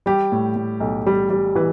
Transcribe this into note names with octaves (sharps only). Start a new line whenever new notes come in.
G3 G4
A2
A2
B1
G3
G3
E3 B4